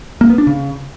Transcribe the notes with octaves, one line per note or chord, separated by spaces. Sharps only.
A#3
B3
D4
C#3